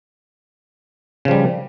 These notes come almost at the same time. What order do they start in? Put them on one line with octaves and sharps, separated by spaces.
C#3 F3 G3